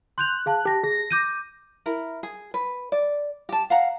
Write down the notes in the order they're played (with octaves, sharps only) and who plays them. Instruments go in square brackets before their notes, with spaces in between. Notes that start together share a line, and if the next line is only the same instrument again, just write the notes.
[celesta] C6 G6 F7 [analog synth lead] F#6
[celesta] G#4 F5 A5
[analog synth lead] G4 [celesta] A5 A#6
[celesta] G#4 [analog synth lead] A#6
[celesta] D6 G6 D#7
[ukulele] E4 A#4
G#4
B4
D5
G4 A5
F5 F#5 A#5